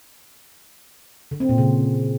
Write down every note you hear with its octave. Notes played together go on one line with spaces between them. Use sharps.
D3
C4
A#2
C#3